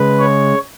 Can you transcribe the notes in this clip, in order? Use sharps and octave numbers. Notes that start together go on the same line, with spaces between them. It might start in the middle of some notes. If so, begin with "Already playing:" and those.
Already playing: C#3 G#3 B4
C#5